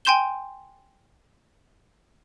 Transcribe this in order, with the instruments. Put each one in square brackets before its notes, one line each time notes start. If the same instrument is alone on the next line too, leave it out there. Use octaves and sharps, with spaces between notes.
[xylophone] G5 G#5 C6 G6 E7 G7